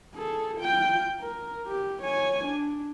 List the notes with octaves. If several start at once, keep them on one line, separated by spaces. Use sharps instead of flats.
G#4 A4
F4 G5
A#4
G4
C#5 G#5
D4